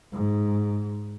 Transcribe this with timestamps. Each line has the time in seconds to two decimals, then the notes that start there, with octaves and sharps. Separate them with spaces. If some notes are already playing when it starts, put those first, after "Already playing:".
0.13 G#2